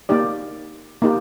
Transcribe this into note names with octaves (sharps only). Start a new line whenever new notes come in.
A#3 D#4 G4 D5
A#3 D#4 G4